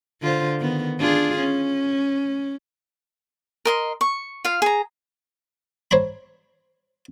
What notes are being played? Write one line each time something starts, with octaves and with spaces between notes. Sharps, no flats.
D3 F4 C5
D#3 B3
D4 F4 G#4
C#4
A#4 D#5 C6
C#6
F4 F5
G#4 A#5
C5 C#5 A#5 B5